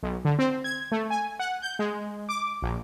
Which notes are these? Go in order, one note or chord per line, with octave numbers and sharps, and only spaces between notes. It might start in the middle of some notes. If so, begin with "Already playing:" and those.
B1
D3
C4
G#6
A3
G#5
F#5
G6
G#3
D6
A#1